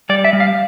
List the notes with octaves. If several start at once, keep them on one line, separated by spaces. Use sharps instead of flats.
G3 D5
E5
G3
F5